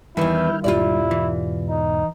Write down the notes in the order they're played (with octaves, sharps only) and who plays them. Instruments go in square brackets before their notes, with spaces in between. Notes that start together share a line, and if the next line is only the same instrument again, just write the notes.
[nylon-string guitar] E2 E3 [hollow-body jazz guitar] G2 D#3 [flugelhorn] E4 [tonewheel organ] F6 G6
[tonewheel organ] E2 G#2 B2 [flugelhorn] E4 [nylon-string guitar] F4 G4 D5
[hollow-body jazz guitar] E3
[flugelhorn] D#4